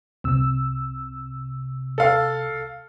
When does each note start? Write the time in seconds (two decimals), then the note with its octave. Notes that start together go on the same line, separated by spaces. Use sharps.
0.24 C2 C3 E6
1.98 A4 F5